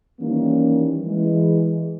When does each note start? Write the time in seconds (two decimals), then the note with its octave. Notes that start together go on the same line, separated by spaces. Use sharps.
0.20 D#3 E3 G3 A#3 C#4
1.06 E3 G#3